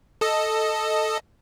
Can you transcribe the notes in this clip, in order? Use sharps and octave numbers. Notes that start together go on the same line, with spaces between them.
A4 D#5